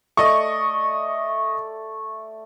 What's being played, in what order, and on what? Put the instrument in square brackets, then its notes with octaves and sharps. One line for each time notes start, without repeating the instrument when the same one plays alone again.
[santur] A3 D5 [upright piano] D#5 C#6